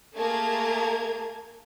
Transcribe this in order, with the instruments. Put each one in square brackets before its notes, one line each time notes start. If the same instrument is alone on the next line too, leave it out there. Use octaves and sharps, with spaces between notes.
[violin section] A3 A#3 G#4 A#4 A5 G#6